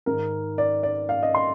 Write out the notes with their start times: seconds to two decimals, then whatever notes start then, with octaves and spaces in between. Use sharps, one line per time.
0.06 G#2 D#3 A#4
0.58 D5
0.83 D5
1.09 F5
1.23 D#5
1.35 C6